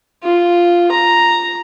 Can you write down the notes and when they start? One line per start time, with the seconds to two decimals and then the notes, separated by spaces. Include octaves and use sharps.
0.23 F4
0.91 A#5